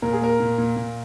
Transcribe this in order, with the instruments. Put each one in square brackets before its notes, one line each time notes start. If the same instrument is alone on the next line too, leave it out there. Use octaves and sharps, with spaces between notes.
[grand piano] A#2 A#4
G#4
A#3 A#4
A#2
A#2
A#2